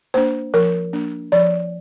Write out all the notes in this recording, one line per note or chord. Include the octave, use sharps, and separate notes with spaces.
A#3 D4 C5
F3 A#4
A#3 D4
F3 D5